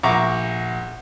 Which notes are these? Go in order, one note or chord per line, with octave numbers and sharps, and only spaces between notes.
A#1 E5 F#5 A#5 C#6 D6